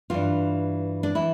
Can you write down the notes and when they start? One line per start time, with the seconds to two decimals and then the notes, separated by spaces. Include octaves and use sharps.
0.10 G2 E3 F4
1.03 D4
1.15 E3 E4